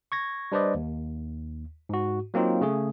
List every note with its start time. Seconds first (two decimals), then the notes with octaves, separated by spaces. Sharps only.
0.12 C#6 G#6 A#6
0.52 G3 D4 B4 C5 D5 D#5
0.75 D#2
1.89 G#2 F#4
2.34 F#3 A#3 C4 D#4 F4
2.61 C#3 A3 G#4